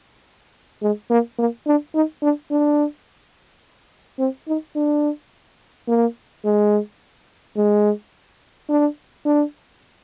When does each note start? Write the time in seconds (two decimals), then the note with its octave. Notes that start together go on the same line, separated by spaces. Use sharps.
0.82 G#3
1.10 A#3
1.39 A#3
1.67 D4
1.95 D#4
2.22 D4
2.51 D4
4.19 C4
4.48 D#4
4.76 D4
5.88 A#3
6.44 G#3
7.57 G#3
8.69 D4
9.25 D4